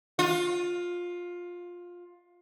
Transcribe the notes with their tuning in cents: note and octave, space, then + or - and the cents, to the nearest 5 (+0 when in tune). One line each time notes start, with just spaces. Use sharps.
F4 +15